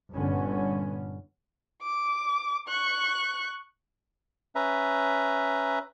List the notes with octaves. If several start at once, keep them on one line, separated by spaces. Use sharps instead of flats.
G1 G2 A#2 D3 B3 C#4
D6
C#6 F#6
C#4 B4 E5 A#5